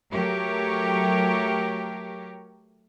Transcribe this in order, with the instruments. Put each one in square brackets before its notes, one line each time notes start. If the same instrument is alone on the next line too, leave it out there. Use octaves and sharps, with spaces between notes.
[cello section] F#3 A3 G4 A#4 C#5